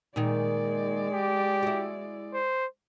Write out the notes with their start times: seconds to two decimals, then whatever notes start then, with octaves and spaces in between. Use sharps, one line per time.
0.16 A#2 D#3 G#3 D5
1.13 G4
1.63 E4 F#4
2.34 C5